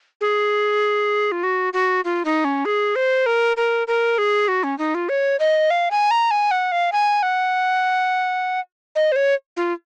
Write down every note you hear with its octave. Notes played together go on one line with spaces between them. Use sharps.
G#4
F4
F#4
F#4
F4
D#4
C#4
G#4
C5
A#4
A#4
A#4
G#4
F#4
C#4
D#4
F4
C#5
D#5
F5
G#5
A#5
G#5
F#5
F5
G#5
F#5
D#5
C5
C#5
F4